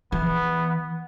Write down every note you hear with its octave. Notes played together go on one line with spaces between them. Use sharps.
E3 B3